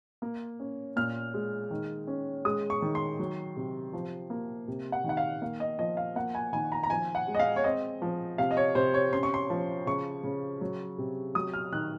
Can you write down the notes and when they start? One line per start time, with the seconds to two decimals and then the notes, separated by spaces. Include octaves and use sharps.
0.22 A#3
0.60 C#4
0.96 A#2 F6
1.34 G#3
1.71 D#3
2.07 C#4
2.45 G#3 D#6
2.70 C#6
2.82 D#3
2.95 C6
3.19 F#3
3.57 C3
3.93 F3
4.30 A#3
4.68 C3
4.92 F#5
5.04 D#3
5.09 F#5
5.17 F5
5.42 A#3 F5
5.60 D#5
5.79 F3 D#5
5.97 F5
6.16 A#3 F#5
6.35 G#5
6.53 D#3 G#5
6.72 A#5
6.83 A#5
6.90 F3 G#5
7.15 F#5
7.27 G#3
7.35 D#5
7.39 F5
7.56 C#5
7.64 C4 D#5
8.02 F3
8.38 C3 F5
8.51 D#5
8.57 C#5
8.75 C3 C5
8.94 C#5
9.13 C#4 C6
9.23 C#6
9.34 C6
9.50 F3
9.87 C#3 C#6
10.24 C#3
10.61 F#3
10.98 C3
11.35 F#3 D#6
11.54 F6
11.72 D#3 F#6